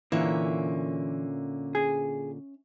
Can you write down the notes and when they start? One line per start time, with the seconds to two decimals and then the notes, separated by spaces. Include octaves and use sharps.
0.12 A#2 D3 E3 A#3 C#4 E5
1.75 G#4